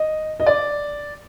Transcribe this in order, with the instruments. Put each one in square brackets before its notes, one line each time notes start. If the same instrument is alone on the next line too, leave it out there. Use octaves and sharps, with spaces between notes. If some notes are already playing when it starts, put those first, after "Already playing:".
Already playing: [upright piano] D#5
D#5
D5